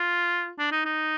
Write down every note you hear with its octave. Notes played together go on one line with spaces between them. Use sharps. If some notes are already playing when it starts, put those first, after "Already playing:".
Already playing: F4
D4
D#4
D#4